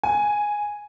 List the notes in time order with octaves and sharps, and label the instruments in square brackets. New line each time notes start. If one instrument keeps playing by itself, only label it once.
[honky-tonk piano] G#5